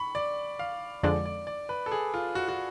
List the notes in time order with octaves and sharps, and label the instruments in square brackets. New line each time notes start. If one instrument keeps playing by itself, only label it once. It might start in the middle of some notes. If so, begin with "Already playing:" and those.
Already playing: [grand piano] B5 C#6
D5
F5
[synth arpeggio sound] F2 D3 G#3 D4 [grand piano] D5
[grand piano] D5
D5
B4
A4
G#4
F4
F#4
F#4